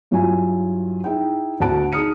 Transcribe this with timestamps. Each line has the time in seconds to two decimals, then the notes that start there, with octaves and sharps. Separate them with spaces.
0.11 G2 F#3 E4 F4 G#5
1.04 D#4 E4 G#4 G5
1.60 D2 F#4 F#5 A5 D7
1.92 D#4 G#4 D#6 F6 C#7 D#7